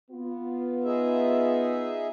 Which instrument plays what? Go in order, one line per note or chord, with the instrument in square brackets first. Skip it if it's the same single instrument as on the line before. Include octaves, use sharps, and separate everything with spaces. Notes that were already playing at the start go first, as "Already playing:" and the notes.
[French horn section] B3 F4
[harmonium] D#4 G#4 E5